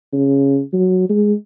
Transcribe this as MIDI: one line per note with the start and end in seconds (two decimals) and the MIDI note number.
0.13 0.61 49
0.73 1.07 54
1.09 1.34 56